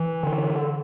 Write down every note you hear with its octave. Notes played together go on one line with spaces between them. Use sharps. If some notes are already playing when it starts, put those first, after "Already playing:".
Already playing: E3
D3